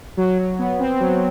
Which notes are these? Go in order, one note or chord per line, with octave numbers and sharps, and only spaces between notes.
F#3
F#3
B3
C4
F#3